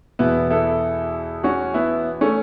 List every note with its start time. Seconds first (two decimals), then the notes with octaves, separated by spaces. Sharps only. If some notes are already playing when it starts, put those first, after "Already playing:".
0.19 E2 B2 B3 E4
0.50 E4 A4
1.43 C#4 F#4
1.74 B3 E4
2.21 A3 C#4